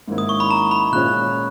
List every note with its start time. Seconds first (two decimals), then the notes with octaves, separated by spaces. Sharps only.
0.08 G#2 D#3 A#3 C#4 E4
0.18 D#6
0.29 C#6
0.40 B5
0.50 A#5
0.71 B5
0.92 A#2 G#3 C#4 F#6